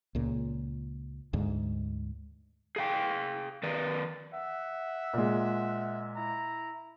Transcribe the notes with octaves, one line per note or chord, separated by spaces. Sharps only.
C#2 A#2
D2 G#2
G#4 F5 G5
D#3 B4 D5
E5 F#5
A#2 G#3
E4 A#5